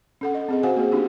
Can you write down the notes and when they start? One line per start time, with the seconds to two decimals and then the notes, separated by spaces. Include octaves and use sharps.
0.21 C#4 A4 F#5
0.34 D#5
0.48 C4 G#4 D#5
0.63 F#4 C5 F5 F#5 G#5
0.77 A#3 F#4 G#4
0.92 B3 C#4 D4 F#4 G4